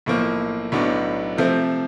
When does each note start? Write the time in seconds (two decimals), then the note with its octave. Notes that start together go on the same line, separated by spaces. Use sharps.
0.06 B1 A2 F3 A#3
0.72 B1 A2 F#3 B3 D4
1.37 C3 F3 A3 C4